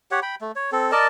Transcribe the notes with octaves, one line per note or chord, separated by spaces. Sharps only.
G4 C#5 F#5
G5 B5
A3
C#5
C4 A4
A#4 D5 D#5 A5